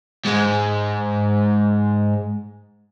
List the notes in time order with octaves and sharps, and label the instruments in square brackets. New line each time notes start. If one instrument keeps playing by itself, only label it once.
[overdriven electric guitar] G#2 G#3